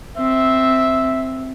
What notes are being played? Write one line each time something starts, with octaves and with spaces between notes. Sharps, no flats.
C4 E5